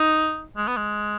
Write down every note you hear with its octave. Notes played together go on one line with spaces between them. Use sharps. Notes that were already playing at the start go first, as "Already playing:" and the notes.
Already playing: D#4
G#3
B3
G#3